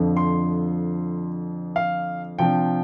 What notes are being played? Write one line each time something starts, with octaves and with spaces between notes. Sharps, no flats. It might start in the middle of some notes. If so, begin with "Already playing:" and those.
Already playing: F2 D3 F3
C6
F5
C3 F3 D4 G5